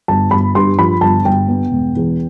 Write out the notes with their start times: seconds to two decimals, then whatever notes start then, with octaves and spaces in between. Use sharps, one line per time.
0.08 G1 A5
0.31 G1 B5
0.55 G2 C6
0.78 F3 B5
1.01 G1 A5
1.25 G1 G5
1.48 B3
1.72 E1
1.96 E2